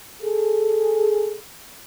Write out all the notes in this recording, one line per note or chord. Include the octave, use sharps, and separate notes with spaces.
G#4 A4